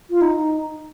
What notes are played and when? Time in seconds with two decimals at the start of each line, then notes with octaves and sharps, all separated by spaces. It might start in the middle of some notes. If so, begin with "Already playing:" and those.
0.10 F4
0.21 D#4